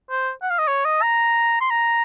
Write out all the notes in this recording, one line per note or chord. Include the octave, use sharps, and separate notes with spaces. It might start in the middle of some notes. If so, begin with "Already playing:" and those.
C5
F#5
F5
D#5
C#5
D#5
A#5
C6
A#5